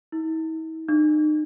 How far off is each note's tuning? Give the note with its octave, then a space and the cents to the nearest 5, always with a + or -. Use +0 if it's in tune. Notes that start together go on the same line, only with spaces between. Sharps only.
E4 -45
D#4 -35